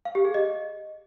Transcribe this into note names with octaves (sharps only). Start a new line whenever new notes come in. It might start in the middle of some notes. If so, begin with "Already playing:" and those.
F5
G4
G#4
D#5